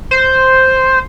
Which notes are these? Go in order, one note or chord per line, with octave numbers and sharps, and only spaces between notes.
C5